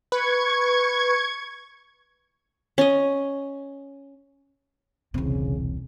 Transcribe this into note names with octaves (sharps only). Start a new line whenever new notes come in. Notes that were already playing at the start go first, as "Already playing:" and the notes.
B4 C#6 G#6
C#4 D#5
E1 C2 C#3 C4